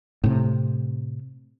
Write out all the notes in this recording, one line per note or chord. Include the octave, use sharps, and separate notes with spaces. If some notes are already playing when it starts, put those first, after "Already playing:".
A2 C3